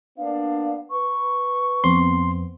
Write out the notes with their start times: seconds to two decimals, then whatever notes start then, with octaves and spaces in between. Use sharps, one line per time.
0.18 A#3 B3 D4 F5
0.91 B4 C#6
1.84 F2 B3 C4 C6